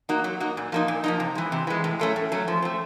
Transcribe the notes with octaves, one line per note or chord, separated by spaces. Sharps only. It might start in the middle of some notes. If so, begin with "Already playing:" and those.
A#3 D#4 F#4
F#3
A#3 D#4 F#4
A#2
F3 A#3 D#4
A#2
F3 A#3 D#4
C3
E3 G#3
C3
E3 G#3
A2
F#3 A3 C#4
A2
F#3 A3 C#4
F3
A3 C4